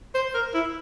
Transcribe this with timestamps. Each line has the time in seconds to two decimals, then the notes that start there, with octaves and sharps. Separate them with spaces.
0.15 C5
0.34 A#4
0.54 E4